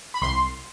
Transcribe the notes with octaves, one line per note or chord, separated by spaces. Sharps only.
B5
C2 C6